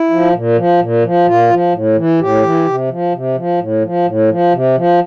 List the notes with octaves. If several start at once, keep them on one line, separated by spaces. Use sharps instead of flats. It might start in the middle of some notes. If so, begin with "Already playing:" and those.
Already playing: E4
F3
A#2
F3
A#2
F3
A#2 F4
F3
A2
E3
A2 G4
E3
C3
F3
C3
F3
A2
F3
A2
F3
C3
F3